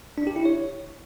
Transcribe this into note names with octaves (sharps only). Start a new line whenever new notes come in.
D4
G4
E4
C#5